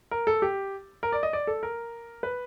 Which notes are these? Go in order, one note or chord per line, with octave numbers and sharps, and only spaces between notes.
A#4
A4
G4
A#4
D5
D#5
D5
A4
A#4
B4